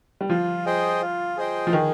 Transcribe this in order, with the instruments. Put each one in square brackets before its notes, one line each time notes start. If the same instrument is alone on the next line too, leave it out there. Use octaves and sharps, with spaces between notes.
[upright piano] G3
[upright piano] F3 [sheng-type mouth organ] F4
[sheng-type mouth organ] G#4 C5 D#5 G5
F4
G#4 C5 D#5 G5
[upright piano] F3
[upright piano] D#3 [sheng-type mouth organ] G#4